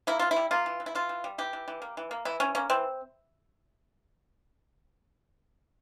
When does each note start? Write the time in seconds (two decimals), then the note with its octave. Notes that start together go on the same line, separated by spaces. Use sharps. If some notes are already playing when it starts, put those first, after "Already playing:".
0.07 A#3 E4
0.19 E3 F4
0.31 E4
0.36 G3
0.51 A#3 F4
0.66 E3
0.80 E3
0.86 E4
0.95 E3 F4
1.09 E3
1.24 G3
1.38 E3 G4
1.53 E3
1.68 E3
1.82 A#3
1.97 E3
2.11 A#3
2.25 E3 E4
2.40 E3 C#4
2.55 A#3 C#4
2.70 E3 C4